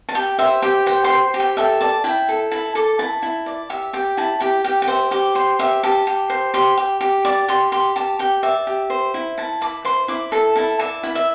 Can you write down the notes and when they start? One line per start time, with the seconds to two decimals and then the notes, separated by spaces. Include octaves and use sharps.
0.09 A5
0.15 G4 G5
0.38 C5 E5
0.62 G4 G5
0.86 C5 G5
1.04 C6
1.10 C5
1.34 G4
1.40 G5
1.57 A4 E5
1.80 D5 A5
2.04 E4 G5
2.29 A4
2.51 E4 A5
2.75 A4 D6
2.99 E4 A5
3.23 E4
3.46 D5
3.70 G4 E5
3.93 G4 G5
4.17 E4 A5
4.40 G4 G5
4.64 G4 G5
4.82 G5
4.88 C5 E5
5.11 G4 D6
5.35 C5 C6
5.59 G4 E5
5.83 G4 A5
6.07 G4
6.30 C5
6.54 G4 C6
6.78 G4
7.01 G4
7.25 D5 D6
7.48 G4 C6
7.72 G4 C6
7.96 G4 A5
8.19 G4 G5
8.43 D5 E5
8.67 G4
8.90 C5
9.14 E4
9.38 E4 A5
9.61 E4 D6
9.85 C5 C6
10.08 E4 D6
10.32 A4 A5
10.55 E4 A5
10.80 D5 E5
11.03 E4
11.15 E5